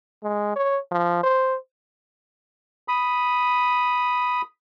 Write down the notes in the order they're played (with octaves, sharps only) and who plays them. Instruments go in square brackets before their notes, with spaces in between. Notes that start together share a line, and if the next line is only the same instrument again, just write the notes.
[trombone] G#3
C#5
F3
C5
[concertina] B5 D#6